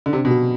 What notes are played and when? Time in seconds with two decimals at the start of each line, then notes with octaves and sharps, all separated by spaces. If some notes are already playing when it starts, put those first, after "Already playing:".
0.06 D3
0.13 C3 D4
0.25 B2
0.31 F#4